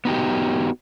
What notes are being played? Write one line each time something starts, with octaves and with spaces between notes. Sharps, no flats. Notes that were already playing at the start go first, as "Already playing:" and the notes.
B3 D#4 F#4 G4